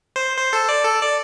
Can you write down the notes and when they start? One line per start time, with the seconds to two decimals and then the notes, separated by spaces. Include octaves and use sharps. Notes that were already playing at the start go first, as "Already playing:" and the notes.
0.16 C5
0.37 C5
0.53 A4
0.69 D5
0.85 A4
1.02 D5